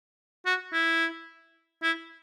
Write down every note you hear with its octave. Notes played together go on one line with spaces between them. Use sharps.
F#4
E4
E4